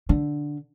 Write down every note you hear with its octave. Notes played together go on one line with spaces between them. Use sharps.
D3